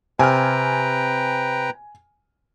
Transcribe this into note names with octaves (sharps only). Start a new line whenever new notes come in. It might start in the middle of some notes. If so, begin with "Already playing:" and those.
C3 B4 G5 G#5 A#5 F6